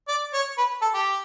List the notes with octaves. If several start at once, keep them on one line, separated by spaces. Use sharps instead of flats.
D5
C#5
B4
A4
G4